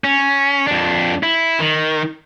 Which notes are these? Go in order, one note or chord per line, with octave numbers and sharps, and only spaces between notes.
C#4
F2 D4
E4
D#3